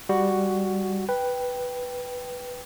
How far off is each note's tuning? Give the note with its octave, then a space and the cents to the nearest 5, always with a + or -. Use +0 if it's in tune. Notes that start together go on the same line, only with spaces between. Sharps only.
G3 +0 F#4 +5
B4 +0 G5 +0